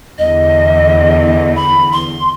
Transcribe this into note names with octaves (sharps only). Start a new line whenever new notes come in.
E2 D3 E3 D#5
B5
C6